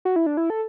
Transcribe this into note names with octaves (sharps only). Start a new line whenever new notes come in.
F#4
E4
D4
E4
A4